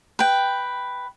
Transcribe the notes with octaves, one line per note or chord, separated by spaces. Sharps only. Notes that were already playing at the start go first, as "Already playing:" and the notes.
B4 G5